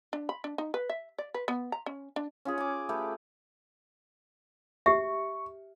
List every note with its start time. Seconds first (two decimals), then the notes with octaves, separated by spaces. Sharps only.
0.13 D4
0.29 B5
0.44 D4
0.58 D#4
0.74 B4
0.89 E5
1.18 D5
1.34 B4
1.48 B3
1.72 A#5
1.86 C#4
2.16 D4
2.45 C#4 F4 G#4
2.58 G#5 D6
2.89 A3 G4 B4
4.86 G4 E5 C#6